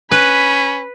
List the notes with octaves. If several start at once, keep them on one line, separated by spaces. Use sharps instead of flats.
C#4 B4 B5